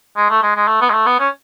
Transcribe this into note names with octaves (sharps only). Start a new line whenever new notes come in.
G#3
A3
G#3
G#3
A3
B3
G#3
A3
B3
C#4